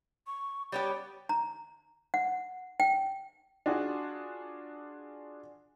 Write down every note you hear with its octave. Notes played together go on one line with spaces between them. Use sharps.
C#6
G3 B3 G4 C#5
A#5
F#5
G5
D4 F4 F#4 G#4